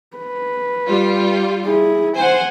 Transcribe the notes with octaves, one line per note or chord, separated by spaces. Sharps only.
B4
G3 F4
E4 G#4
C5 F#5 G#5